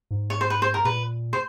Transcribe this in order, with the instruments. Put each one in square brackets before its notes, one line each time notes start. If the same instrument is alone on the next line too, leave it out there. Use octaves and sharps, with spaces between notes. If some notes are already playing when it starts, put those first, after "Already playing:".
[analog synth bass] G#2
[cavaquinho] C#5
C5
B4
C5
A#4
[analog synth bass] A#2 [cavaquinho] B4
[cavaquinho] C5